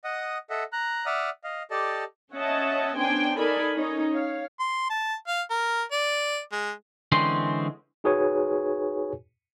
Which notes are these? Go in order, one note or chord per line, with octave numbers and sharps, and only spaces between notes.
D#5 F#5 D#6
A4 D#5 E5 F#5
A#5 F#6
D5 E5 F#5 D#6 F6
D#5 F5
G4 A4 D5 D#5 A5
C#4 C#5 D#5 E5 F#5 A5
B3 C#4 D4 C5 G5 G#5
D#4 A4 A#4 D5 G#5 B5
C#4 D#4 C#5
C#5 F5
C6
A5
F5
A#4
D5
G#3
D3 E3 G#3 C4 C#4 C6
D#4 F#4 G#4 B4 C#5 G#5